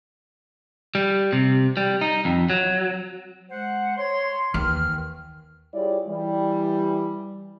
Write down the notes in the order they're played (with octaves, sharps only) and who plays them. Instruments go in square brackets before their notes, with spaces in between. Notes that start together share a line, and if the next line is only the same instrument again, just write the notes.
[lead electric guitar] G3
C3
G3
D#4
F2
F#3
[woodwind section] G#3 C5 F#5
C#5 C6
[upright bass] D#2 [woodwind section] D#3 E3 F6
[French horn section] G3 E4 F4 G#4 C#5 D5
E3 G3